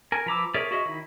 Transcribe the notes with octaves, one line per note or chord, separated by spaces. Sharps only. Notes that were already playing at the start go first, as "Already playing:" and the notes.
A#4 G#5
F3 B4 A#5 D6 E6
G#4 A#4 C#5 D5 E5
F#4 G#4 C#5 D#5 E5
D#3 E4